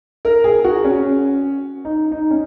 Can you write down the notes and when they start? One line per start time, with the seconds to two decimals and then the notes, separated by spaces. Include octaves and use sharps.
0.25 A#4
0.44 G#4
0.64 F#4
0.84 C#4
1.85 D#4
2.12 D#4
2.31 C#4